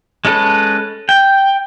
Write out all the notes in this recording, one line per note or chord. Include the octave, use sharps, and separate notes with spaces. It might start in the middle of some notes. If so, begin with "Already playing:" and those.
G#3 C#4 A4 B4
G5